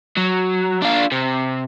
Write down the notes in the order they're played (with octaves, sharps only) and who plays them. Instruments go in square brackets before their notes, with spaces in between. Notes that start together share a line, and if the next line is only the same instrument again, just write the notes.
[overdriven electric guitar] F#3
D4 F4
C3